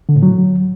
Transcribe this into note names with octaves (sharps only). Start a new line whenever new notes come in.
D3
A2
F#3